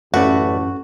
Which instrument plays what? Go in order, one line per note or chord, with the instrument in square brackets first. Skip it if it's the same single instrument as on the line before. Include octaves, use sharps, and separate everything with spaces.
[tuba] A1 [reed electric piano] F#2 C#4 [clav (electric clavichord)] A3 B4 D5 [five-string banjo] F#4